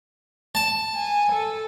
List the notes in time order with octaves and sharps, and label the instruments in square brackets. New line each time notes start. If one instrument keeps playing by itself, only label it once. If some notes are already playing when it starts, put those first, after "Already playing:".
[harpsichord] A5
[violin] G#5
A4